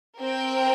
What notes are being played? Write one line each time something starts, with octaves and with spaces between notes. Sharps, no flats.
C4 A#4 G5